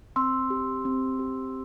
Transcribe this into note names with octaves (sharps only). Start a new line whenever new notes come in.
C4 C6 E6
G4
C4
G4